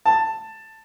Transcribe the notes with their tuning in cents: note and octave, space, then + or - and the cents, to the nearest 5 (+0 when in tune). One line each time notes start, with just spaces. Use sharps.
A5 +10